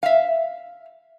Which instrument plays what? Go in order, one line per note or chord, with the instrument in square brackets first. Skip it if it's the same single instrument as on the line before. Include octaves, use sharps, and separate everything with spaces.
[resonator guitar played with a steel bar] E5 F5